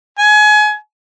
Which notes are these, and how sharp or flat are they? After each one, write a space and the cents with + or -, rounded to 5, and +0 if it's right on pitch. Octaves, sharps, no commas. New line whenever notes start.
G#5 +30